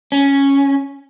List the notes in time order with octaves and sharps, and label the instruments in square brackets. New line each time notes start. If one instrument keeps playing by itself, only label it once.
[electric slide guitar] C#4